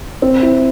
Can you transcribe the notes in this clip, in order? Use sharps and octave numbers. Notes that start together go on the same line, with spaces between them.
C4
E4